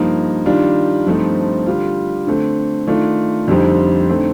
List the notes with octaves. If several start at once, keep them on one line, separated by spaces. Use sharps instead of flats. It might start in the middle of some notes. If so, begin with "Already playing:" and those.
Already playing: G2 F3 A#3 D#4
D#3 G3 D4 F4
G2 F3 A3 C4 D#4
D3 G3 D4 F4
D3 A3 C4
D#3 A3 D4 F4
F2 D3 G3 C4 D#4
D3 A3 C4 D#4